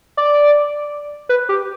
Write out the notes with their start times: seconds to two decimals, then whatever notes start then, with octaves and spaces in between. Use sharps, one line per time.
0.17 D5
1.29 B4
1.49 G4